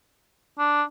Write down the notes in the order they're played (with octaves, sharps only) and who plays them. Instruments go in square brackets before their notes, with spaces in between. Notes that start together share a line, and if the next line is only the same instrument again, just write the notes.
[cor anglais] D4